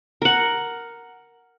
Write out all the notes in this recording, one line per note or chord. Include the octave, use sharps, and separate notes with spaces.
A#4 F#5